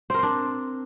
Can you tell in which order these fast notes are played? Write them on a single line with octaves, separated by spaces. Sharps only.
C4 A#4 C5 D4